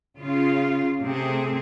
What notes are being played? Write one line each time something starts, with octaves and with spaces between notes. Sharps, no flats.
C#3 F4
C3 A3 C4 G#4